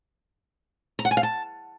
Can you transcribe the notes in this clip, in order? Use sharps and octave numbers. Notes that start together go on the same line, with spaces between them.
A#5
F#5
G#5
F5
A5